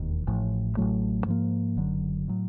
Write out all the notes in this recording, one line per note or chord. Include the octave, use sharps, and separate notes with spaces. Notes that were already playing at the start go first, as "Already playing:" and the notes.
Already playing: E1 D#2 D#3
A1 A2 F3
A1 A2 F#3 A3
G#2 F3 A#3
F#1 F#2 D3 F#3
A2 F#3